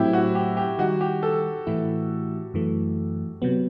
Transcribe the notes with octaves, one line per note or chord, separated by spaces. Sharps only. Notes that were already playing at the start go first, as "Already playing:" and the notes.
Already playing: A2 F#3 A3 C4 E4 G4
F#4
G4
G4
D#3 G3 D#4 F#4
G4
A4
A2 E3 A3 E4
F#2 E3 A3
C3 F#3 B3